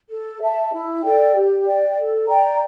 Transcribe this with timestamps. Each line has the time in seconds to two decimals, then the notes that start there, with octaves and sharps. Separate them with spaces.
0.10 A4
0.41 E5 A5
0.73 E4
1.03 A4 D5 G5
1.34 G4
1.66 D5 G5
1.97 A4
2.28 D5 G5 A#5